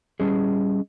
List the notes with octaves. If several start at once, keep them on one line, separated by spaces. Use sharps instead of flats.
G3 C#4 G#4 D#5